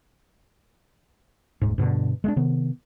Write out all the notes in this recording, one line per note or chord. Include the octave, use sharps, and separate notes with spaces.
D#1 G#2
G2 B2 D3
G#3 A3 D4
C3 D#3 B3